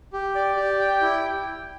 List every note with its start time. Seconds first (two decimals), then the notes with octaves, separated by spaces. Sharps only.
0.13 G4
0.35 D5
0.56 G4
0.79 G5
1.01 E4